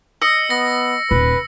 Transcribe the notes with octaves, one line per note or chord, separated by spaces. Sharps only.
D#5 E6 C#7
B3 A#6
D#1 B4